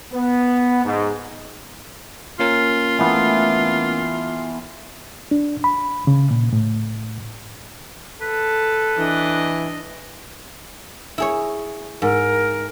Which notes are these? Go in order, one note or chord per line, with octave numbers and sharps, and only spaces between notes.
B3
G#2
A#3 C#4 F4 A#4
E3 A3 B3
D4
B5
C#3
A#2
A2
A4 B4
E3 D4 D#5
E4 G#4 C#5
G#2 A#4